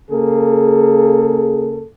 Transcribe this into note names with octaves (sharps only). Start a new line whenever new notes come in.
C#3 A#3 G#4 A4